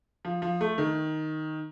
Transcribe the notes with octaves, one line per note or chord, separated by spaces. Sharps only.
F3
F3
A3
D#3